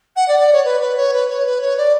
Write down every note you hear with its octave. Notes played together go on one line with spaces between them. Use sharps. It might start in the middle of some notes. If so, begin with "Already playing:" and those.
F#5
D5
D5
C#5
B4
B4
C#5
B4
C#5
B4
C#5
D5